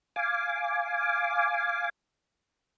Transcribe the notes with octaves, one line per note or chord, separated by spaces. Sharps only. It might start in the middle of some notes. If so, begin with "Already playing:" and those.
F5 G#5 D6